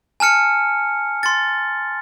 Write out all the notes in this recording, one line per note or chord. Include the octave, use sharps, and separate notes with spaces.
G#5 A5 F6 C#7
C6 A6